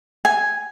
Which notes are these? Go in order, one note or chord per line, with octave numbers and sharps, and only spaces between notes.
G#5